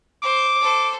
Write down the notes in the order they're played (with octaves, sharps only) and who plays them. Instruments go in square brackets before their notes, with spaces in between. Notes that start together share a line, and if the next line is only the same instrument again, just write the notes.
[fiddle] C5 [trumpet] D6
[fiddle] A4 C5